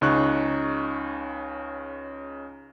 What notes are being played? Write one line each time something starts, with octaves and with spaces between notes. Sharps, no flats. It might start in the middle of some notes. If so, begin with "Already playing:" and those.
C#2 C#3 D#4 C#6 F#6